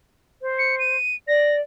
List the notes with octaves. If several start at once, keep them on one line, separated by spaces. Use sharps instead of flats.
C5
C#7
D#7
D5 A#6